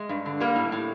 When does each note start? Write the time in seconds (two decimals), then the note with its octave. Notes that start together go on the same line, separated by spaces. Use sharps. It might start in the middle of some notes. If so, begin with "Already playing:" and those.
Already playing: G#3
0.09 G2
0.26 D3
0.40 G3 A#3
0.56 A2
0.72 A2